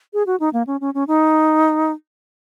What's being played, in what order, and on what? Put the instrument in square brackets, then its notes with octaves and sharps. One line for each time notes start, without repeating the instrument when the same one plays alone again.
[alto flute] G#4
F#4
D#4
A#3
C#4
C#4
C#4
D#4